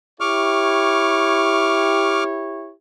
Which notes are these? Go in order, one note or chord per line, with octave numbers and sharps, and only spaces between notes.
E4 G4 C#5 C#6 D6 F6